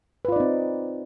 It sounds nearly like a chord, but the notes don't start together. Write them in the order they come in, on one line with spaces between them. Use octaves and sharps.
B4 F4 D5 D#4 C4